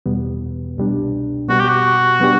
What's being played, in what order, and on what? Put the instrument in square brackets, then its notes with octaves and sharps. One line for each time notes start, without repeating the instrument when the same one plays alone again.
[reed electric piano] E2 B2 G3 B3
C2 B2 G3 D4
[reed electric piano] B2 G3 B3 [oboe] F#4
[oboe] G4
F#4
[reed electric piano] F#3 B3 D4 G4